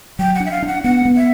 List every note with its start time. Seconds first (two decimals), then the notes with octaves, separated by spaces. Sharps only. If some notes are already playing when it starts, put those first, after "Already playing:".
0.19 F#3 G5
0.35 F#5
0.40 D4
0.46 E5
0.51 F5
0.62 D4
0.68 F#5
0.84 B3 F#5
1.05 B3
1.17 E5